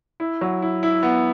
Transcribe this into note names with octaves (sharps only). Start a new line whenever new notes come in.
E4
F#3
E4
E4
B3